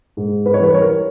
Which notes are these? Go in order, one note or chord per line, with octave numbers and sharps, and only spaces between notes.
G#2
B4
C#5
E3 G3 B4
A#4 C#5